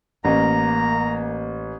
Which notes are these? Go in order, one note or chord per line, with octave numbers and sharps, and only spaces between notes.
A1 A#3 A#5